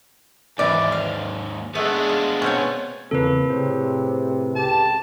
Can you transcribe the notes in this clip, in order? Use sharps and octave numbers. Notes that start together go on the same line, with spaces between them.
D#2 G#2 C3 E3 D5
F5
G#3 A3 B3 D4
F4
B2 C4 C#4 C#5
E2 C#3 F3 A#3 C4 A4 B4
A2 C3 G#4 C5 C#5
C#2 G4 A5